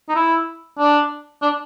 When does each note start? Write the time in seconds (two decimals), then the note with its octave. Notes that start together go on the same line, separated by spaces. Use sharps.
0.09 D#4
0.16 E4
0.79 D4
1.42 D4